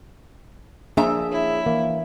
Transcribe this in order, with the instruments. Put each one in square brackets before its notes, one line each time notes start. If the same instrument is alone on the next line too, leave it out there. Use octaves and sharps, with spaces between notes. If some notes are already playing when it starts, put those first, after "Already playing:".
[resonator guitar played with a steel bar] F3 E5 A#5 [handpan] A#3 D4 [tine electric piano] G#4
[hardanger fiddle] E4 [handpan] C#5
[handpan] E3 [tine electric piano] A#3